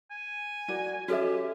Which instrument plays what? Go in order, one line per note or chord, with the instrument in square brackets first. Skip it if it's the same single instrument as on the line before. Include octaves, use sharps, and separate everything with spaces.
[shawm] G#5
[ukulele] F#4 A#4 D5
[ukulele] C#4 E5 [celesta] F#4 A4 D#5 [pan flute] G4